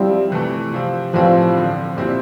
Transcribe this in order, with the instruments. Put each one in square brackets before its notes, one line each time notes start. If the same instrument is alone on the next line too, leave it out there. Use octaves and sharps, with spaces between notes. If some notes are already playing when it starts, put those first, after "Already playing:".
Already playing: [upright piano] F3 C4 E4 [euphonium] G3
[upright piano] C3 E3 A3
C3 F3 C4
[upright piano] A2 E3 G3 C4 [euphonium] F3
[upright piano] D3 F3 C4
A#2 G3 C4 E4